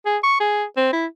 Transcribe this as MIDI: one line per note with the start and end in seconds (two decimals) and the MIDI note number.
0.06 0.18 68
0.23 0.36 85
0.40 0.64 68
0.77 0.92 60
0.93 1.06 64